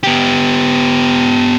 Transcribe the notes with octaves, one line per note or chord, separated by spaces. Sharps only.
B3 G4